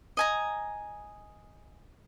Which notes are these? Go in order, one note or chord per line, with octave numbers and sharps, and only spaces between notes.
D#5 G#5 A#5